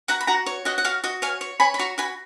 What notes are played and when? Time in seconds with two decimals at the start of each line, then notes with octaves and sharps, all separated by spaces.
0.08 F#4 F#5 A#5
0.21 B5
0.27 F#4 F#5 A#5
0.46 C#5
0.65 F#4 D#5 F#5
0.78 F#5
0.85 F#4 F5
1.04 F#4 D#5
1.22 C#5 F5 G#5
1.41 C#5
1.60 C#5 G#5 B5
1.74 B5
1.79 F#4 A#5 C#6
1.98 F#4 G#5 B5